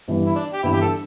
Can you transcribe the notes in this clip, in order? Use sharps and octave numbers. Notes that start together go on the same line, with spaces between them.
G1 G2 E3
E4
D4
G4
G1 G2 E3 E4
G4
A4